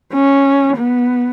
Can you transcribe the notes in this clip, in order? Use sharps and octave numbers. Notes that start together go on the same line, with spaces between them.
C#4
B3